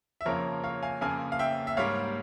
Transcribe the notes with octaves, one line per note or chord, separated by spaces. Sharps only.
E5
F2 C#3 F3 A#3 A#4 C#5
C#5 F5
F5 G#5
F2 C#3 F3 A#3 F5 G#5
F5
E5 G5
E5
G#2 G3 A#3 C#5 F5